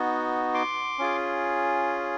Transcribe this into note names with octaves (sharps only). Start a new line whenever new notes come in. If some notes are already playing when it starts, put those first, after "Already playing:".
Already playing: B3 D#4 F#4
C6 D6
C#4 F4 G#4